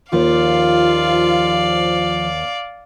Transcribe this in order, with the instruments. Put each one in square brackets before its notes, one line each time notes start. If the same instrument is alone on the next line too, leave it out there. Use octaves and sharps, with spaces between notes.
[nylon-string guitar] D#2 [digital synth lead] F3 [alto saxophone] F4 [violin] D5 F5